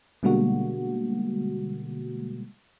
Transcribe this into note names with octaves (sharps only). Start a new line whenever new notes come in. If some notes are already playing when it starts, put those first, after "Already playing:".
B2 D3 G3 G#3 A#3 F#4